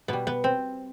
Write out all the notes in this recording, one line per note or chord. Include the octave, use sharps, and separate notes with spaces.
B2 G3 B3
B3
C4